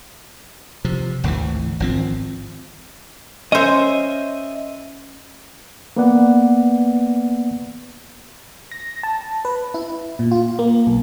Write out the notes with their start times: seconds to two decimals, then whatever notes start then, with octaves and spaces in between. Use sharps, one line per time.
0.85 C3 F3
1.24 G#1 D2 D#3 E3
1.80 G#1 F3 C4
3.52 C#4 C5 D#5 E5
5.96 A#3 B3 B4 D5 F#5
8.71 A#6
9.03 A5
9.45 B4
9.74 E4
10.19 A#2
10.31 F4
10.59 A#3
10.87 B1